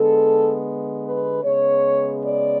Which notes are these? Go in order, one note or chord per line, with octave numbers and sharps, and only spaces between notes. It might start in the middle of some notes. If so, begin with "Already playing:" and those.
Already playing: D3 G#3 B3 A4
B4
C#3 G#3 B3 C#5
D5